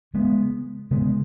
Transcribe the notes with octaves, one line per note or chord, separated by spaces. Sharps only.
C#3 G#3 B3
C#3 G#3 B3